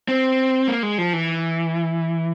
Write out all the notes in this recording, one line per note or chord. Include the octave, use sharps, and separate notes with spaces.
C4
A#3
G#3
F3
E3